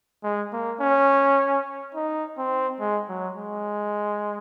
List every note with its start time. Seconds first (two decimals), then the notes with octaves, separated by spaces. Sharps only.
0.24 G#3
0.53 A#3
0.80 C#4
1.95 D#4
2.38 C4
2.80 G#3
3.09 F#3
3.37 G#3